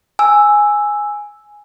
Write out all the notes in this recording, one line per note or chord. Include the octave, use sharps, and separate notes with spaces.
G#5 E6